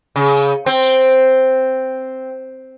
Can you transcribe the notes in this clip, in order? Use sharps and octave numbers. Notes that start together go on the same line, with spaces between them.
C#3
C4